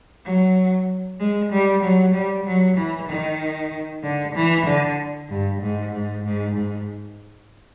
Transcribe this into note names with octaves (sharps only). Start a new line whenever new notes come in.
F#3
G#3
G3
F#3
G3
F#3
E3
D#3
D3
E3
D3
G2
G#2
G#2
G#2
G#2